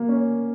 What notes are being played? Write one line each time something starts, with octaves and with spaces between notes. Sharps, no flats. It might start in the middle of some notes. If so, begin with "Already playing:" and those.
Already playing: A#3
C#4